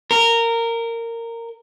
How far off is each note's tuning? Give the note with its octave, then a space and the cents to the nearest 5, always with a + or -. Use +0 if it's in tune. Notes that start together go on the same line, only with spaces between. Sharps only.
A#4 -15